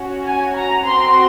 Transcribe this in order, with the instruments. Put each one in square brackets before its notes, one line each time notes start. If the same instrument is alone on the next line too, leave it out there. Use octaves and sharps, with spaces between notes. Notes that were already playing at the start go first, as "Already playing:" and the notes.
Already playing: [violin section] C#4 F#4
G#5
A#5
C4 F#4 C6